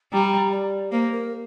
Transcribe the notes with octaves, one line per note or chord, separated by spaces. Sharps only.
G3 A#5
D5
A#3 C5
A#4